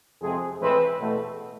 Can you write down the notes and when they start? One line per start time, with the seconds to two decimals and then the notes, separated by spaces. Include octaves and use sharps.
0.22 F2 C3 G#3 C4 G#4
0.61 A2 E3 G#3 C4 B4
1.00 E2 B2 A3